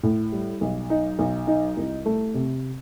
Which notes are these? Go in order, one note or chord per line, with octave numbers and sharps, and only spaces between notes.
A2
G3
B1
D#4
B1
D#4
C2
A3
C3